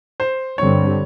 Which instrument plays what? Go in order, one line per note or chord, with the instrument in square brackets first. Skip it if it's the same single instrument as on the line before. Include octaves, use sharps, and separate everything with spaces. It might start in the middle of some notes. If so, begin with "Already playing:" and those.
[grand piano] C5
[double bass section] G2 D3 G3 C4 [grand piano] C#5